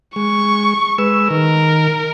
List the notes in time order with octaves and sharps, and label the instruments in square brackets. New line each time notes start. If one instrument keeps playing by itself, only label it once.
[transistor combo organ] G#3 [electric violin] C#6
[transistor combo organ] G#3 B4 E6
[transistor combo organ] D#3 [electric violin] A#4